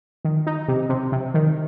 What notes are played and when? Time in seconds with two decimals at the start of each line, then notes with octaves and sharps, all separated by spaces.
0.25 D#3
0.47 D#4
0.68 C3
0.89 C3
1.12 C3
1.34 D#3